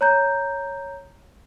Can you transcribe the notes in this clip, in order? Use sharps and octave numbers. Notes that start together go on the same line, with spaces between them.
C#5 A#5 G6